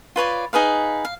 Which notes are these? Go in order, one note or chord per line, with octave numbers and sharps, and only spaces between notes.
F4 B4 C#5 D5
D#4 G#4 B4 F5
F5